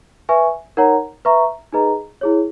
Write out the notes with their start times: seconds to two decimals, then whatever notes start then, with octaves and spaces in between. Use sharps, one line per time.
0.29 B4 E5 G#5 C#6
0.77 D#4 A#4 C#5 F#5 A#5
1.25 B4 E5 A#5 C#6
1.73 D#4 G#4 B4 D#5 A#5
2.21 E4 G#4 C#5